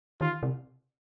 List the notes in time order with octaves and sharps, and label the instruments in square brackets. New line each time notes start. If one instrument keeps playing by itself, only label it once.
[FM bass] D#3 [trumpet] F4
[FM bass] C3